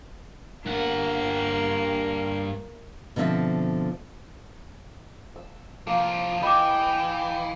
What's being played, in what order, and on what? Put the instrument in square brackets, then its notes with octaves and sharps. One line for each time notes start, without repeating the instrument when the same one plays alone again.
[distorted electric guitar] G2 F#5 [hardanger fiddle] A#3
[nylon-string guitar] B2 D3 F3 C4 E5
[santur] E6
[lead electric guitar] C2 F3 [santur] A#3
[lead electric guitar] E3 [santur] D#5 [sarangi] G5 [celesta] B5 D6